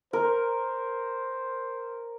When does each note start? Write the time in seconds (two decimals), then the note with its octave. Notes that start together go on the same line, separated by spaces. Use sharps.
0.13 A#4 C5